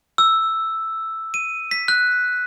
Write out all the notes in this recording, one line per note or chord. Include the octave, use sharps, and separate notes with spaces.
E6
D#7
B6
F#6